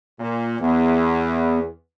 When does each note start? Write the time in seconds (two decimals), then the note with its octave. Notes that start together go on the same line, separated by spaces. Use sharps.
0.19 A#2
0.60 E2 B3